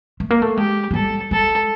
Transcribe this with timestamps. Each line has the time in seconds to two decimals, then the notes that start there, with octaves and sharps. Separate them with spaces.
0.20 A3
0.30 A#3
0.42 A3
0.57 G#3 G4
0.91 G#3
0.94 G3 A4
1.31 G#3 A4